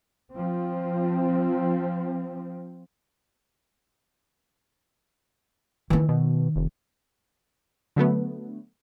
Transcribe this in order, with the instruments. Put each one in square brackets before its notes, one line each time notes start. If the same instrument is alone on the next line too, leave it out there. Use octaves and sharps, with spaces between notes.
[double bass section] F3 C4
[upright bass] D#3 C4 [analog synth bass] E3
[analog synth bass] B2
F1
[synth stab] D3 F#3 A3 B3